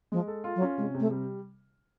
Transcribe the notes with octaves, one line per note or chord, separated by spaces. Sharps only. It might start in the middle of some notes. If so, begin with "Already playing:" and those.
F3 G#3
A4
F4
F#3
C#4
C3 G#3
C3
A3
G3